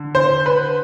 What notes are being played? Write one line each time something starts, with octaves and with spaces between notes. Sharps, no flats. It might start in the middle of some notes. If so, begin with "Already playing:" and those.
Already playing: D3
C5
B4